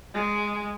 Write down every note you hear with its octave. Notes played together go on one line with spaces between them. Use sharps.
G#3